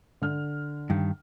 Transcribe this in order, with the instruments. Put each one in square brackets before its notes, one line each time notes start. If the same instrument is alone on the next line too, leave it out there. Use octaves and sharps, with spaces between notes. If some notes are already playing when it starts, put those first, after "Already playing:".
[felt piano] D3 F6
[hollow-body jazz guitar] G2 D#3